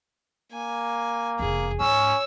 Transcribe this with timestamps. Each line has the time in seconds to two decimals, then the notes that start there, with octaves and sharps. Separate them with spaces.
0.52 A#3 G#5
1.39 F1 E2 G#4
1.80 G#2 C#4 C#5 E6